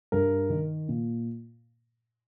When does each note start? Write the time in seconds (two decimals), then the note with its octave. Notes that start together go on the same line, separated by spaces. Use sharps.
0.12 G2 A#4
0.50 D#3
0.89 A#2